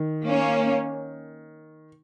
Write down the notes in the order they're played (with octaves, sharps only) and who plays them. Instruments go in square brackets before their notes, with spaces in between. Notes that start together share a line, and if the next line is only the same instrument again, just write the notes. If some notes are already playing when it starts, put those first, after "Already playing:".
Already playing: [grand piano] D#3
[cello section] A#3 C#4